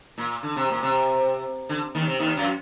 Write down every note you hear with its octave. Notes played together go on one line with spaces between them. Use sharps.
A#2
D3
C3
A#2
C3
D3
D#2 D#3
C3
D#2 D#3
F#2 F#3